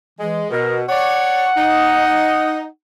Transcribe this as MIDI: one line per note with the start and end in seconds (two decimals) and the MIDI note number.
0.19 0.44 52
0.19 0.48 56
0.50 0.82 47
0.50 0.80 70
0.88 1.48 73
0.88 1.48 74
0.88 2.67 78
1.55 2.64 63